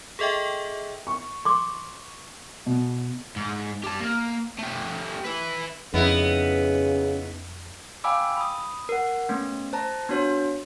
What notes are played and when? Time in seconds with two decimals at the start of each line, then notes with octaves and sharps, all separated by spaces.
0.19 G#4 A4 D#5 E5 G5
1.07 C#6
1.45 C6 D6
2.66 B2
3.36 G#2
3.84 G4 A5
4.00 A#3
4.58 A3 G4
5.25 E4 B4
5.94 F2 C#3 B3 D#4 E4
8.04 F5 G5 G#5 B5 D6 E6
8.37 B5 D#6
8.89 A#4 F#5
9.29 A3 B3 C#4
9.73 C5 A5 A#5
10.09 B3 D4 F#4 C#5